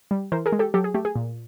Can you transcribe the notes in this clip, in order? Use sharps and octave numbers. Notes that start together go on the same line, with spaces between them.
G3
E3 A#4 C5
G#4 A#4
G#3
G4 A4
F#3 G4 A4
G#4
A3 G4
G#4
A#2